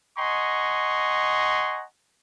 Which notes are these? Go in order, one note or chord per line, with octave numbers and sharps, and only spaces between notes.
D#5 F#5 G#5 A#5 C6 C#6